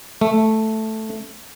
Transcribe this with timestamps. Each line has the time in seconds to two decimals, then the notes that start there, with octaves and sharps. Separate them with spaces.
0.21 A3